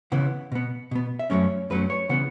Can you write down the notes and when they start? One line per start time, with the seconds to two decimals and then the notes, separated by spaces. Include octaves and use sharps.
0.12 C#3 E3 B3 F#5
0.52 B2 B3
0.91 B2 B3
1.19 E5
1.30 F#2 F#3 A3 C#4 C#5
1.70 F#2 F#3 A3 C#4 B4
1.90 C#5
2.09 C#3 E3 B3 F#5